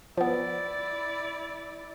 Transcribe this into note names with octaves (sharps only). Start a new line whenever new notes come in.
F3 B3 E4 D5